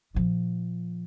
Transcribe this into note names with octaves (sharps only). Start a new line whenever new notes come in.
A#2 F3